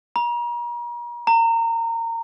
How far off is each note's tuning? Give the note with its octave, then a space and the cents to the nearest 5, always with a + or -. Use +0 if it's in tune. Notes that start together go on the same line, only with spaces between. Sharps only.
A#5 +40
A#5 -25